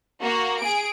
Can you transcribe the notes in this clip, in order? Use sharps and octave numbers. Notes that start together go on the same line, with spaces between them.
A#3 F#4
G#4 D7